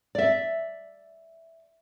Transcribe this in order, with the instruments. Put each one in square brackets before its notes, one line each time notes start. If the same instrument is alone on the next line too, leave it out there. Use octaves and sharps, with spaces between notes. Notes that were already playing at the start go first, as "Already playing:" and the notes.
[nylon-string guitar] D5 E5